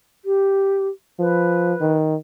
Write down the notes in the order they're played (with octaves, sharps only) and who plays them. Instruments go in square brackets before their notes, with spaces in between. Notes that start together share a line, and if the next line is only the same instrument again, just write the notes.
[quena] G4
[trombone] F3 [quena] B4
[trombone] D#3